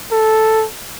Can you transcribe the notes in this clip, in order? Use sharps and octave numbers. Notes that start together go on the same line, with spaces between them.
A4